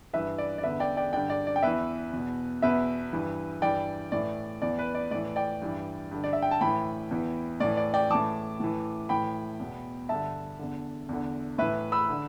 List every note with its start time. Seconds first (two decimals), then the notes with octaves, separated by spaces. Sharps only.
0.13 G2 E3 B4 E5
0.38 D5
0.58 D5
0.63 E2 D3 B4 E5
0.80 D5 G5
0.97 D5 G5
1.13 G2 D3 D5 G5
1.30 D5
1.47 D5
1.56 G5
1.63 E2 E3 B4 E5
2.13 E2 B2
2.62 E2 B2 B4 E5
3.13 G2 E3
3.62 G2 E3 D5 G5
4.12 A2 E3 D5
4.62 E2 E3 D5
4.79 B4
4.95 D5
5.11 A2 E3 D5
5.36 D5 G5
5.62 G2 E3
6.11 G2 D3
6.24 D5
6.33 E5
6.42 G5
6.51 A5
6.61 A2 E3 G5 B5
7.11 E2 E3
7.60 A2 E3 D5
7.77 D5
7.94 D5 G5
8.10 A2 E3 A5 D6
8.60 A2 E3
9.09 A2 E3 G5 B5
9.60 E2 B2
10.09 G2 D3 E5 A5
10.59 E2 D3
11.09 E2 D3
11.58 A2 E3 B4 E5
11.92 B5 E6
12.09 D3